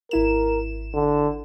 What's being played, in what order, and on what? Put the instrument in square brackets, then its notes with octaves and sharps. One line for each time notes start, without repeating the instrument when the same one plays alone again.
[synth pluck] G#1 E4 E7 [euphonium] A#4
[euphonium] D3